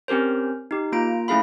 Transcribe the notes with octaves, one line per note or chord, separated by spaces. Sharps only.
C4 C#4 G4 A#4 C5
D#4 G4
A#3 F4 A#5 D7
A3 C#4 E4 G#4 F5 B5